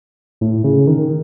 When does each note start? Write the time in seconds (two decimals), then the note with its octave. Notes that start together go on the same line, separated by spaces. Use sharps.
0.41 A2
0.64 C#3
0.87 D#3